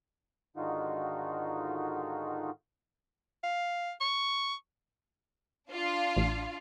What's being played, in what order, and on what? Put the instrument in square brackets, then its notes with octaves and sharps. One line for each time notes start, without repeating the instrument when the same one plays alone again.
[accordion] G#2 D3 D#3 D#4 F4 F#4
[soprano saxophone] F5
C#6
[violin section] D4 F4 F5
[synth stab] A1